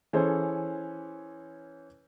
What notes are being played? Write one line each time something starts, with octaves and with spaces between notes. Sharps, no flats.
E3 C#4 G#4 A4 C5